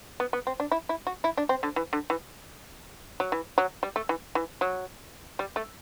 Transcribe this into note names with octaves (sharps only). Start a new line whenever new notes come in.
B3
B3
C4
D4
E4
E4
F#4
E4
D4
C4
D3
E3
D3
E3
F#3
E3
F#3
G3
A3
E3
E3
F#3
G3
A3